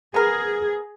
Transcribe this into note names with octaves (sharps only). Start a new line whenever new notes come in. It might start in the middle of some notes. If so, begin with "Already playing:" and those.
B3 G#4 A#4